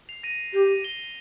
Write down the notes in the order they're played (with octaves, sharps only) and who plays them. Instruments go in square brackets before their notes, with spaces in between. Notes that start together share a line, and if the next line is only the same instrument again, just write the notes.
[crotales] C7 F7
A#6 D#7
[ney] G4
[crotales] D#7 G7